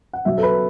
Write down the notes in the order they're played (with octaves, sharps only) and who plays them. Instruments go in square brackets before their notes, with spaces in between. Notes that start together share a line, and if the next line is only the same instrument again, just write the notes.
[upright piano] F#5
B1 B2 E5
A4
B4